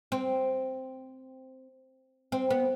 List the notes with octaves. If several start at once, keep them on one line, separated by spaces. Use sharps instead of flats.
C4
C4
B3